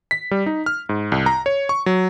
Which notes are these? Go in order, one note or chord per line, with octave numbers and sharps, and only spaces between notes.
B6
G3
D#4
F6
G#2
C2
A#5
C#5
C#6
F#3